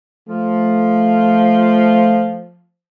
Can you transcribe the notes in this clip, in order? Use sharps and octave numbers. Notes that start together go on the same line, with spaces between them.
F3 A3